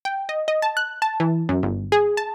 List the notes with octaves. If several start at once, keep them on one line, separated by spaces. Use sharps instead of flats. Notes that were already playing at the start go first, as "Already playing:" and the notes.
G5
D#5
D#5
A5
F#6
A5
E3
F#2
G1
G#4
A5